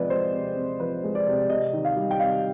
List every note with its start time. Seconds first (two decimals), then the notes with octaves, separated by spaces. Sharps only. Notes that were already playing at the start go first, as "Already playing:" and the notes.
Already playing: C3 F3 G#3 C4 B4 D5 D#5
0.10 G#3 C5
0.33 C3
0.56 C4
0.80 F3 B4
1.04 G#3
1.15 D5
1.27 C3
1.50 C3 D#5
1.73 D#3
1.85 F5
1.96 G3
2.11 G5
2.20 C3 F5